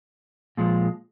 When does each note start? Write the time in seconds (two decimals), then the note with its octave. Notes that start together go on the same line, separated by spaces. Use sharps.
0.57 A#2 F3 G#3